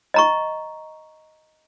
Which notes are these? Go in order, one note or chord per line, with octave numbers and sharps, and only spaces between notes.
D#5 A#5 C#6